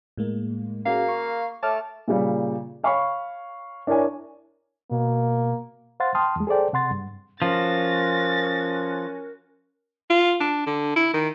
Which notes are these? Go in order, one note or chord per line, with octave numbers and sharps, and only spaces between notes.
A2 G#3 A#3
A#3 C#4 F#4 G#4 F5
C#6
A3 C#5 A5 D6 F6
A#2 C#3 G3
C#5 F5 B5 C#6
D4 E4 A#4 C#5 G#5
B2 A#3
C5 F5 F#5 C6 A6
G5 A5 C6 D#6 F6
E2 G#3
G#4 A4 C5 D5 G5
C3 F#5 C6 A6
G2
F3 C#4 F#4 A#4 A6 A#6
F4
D4
D3
E4
D#3